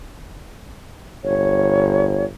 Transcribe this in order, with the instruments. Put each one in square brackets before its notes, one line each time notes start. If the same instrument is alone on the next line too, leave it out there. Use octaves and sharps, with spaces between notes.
[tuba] G1 [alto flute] C#5